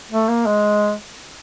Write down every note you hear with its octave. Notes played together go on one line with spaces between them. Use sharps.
A3
A#3
G#3